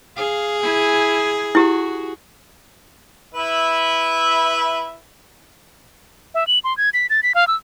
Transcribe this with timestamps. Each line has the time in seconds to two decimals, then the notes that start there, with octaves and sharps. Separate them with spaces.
0.17 G#4 F5
0.63 E4 G#5
1.55 E4 F#4 G4
3.34 E4 B4 E5
6.34 E5
6.47 F#7
6.64 C6
6.77 G#6
6.94 B6
7.10 A6
7.23 B6
7.35 F5
7.48 E6